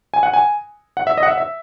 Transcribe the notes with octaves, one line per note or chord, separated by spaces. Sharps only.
G#5
F#5
G#5
F#5
E5
D#5
F#5
E5
E5